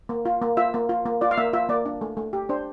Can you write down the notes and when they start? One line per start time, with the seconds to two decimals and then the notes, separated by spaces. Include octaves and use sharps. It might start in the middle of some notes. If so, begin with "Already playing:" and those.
0.09 A#3
0.25 F4
0.42 A#3
0.57 F4 E5
0.74 A#3
0.89 F4
1.06 A#3
1.21 F4 D5
1.31 F5
1.37 A#3 E5
1.53 F4 E5
1.69 A#3 D5
1.86 D4
2.01 A3
2.17 A3
2.33 G4
2.49 D4 C5